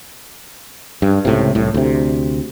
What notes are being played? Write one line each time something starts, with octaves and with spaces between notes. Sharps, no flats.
G2
C#2 A2 C3
C2 A2
D2 C3